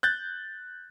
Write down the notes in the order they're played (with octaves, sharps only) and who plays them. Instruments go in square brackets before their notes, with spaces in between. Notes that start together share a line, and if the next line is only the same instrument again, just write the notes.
[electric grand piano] F#6 G6 A6